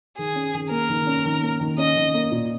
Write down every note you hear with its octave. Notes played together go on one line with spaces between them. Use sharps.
D#3 G#4
C#4
D#3
A#3 A#4
D#3
C#4
D#3
A#3
D#3
C#4 D#5
D#3
A#3
A#2